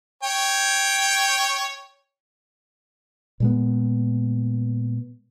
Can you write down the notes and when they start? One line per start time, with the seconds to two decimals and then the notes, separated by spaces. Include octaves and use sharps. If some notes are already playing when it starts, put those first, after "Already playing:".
0.23 C#5 G5
3.40 A#2 G#3 B3